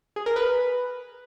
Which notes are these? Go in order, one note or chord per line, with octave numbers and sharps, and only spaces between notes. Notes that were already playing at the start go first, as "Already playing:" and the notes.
G#4
A#4
B4